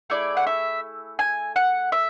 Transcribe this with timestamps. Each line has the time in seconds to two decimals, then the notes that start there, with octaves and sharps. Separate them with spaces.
0.10 A3 E4 G#4 D5
0.37 F#5
0.47 E5
1.19 G#5
1.56 F#5
1.92 E5